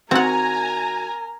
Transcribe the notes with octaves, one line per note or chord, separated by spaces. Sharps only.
D#3 C4 F#4 A#4 F#5 G#5 A#5